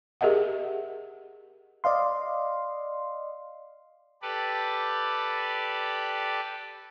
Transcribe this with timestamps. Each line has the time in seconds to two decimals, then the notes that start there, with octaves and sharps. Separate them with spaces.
0.21 G4 G#4 A#4 D#5 E5 F#5
1.84 D5 D#5 F5 C6
4.22 G4 A4 B4 D5